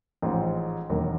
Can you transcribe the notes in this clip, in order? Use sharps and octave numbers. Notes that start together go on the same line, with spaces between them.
A1 G#2 F3 C5
E1 D#2 D#3 F#3